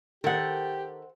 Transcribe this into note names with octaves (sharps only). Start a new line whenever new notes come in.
D#3 G4 A4 A#4 C5 F#5